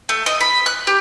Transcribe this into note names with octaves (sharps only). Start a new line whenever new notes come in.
A3
D#5
B5
F#6
G4